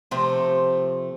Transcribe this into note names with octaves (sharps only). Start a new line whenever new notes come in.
C3 F3 A3 C5